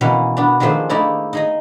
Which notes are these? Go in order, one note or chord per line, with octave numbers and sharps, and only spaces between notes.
B2 E3 A#3 C#4
B3 D4
D#3 F3 G#3 A3 D4 C5
A3 A#3 D#4 E4 D5
D#4 G#4 D#5